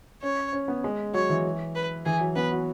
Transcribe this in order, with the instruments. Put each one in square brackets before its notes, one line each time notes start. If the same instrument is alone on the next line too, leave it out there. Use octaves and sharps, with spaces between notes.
[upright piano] C#4 [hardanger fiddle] C#5
[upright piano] C#4
B3
G#3
[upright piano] F#3 [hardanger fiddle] C#5
[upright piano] E3
[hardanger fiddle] B4
[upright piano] E3 [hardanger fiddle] G#4
[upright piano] F#3
[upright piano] B3 [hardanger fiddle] B4
[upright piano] F#4